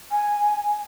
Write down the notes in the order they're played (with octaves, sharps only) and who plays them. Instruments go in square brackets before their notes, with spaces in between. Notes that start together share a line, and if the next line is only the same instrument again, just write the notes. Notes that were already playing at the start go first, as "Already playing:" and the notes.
[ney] G#5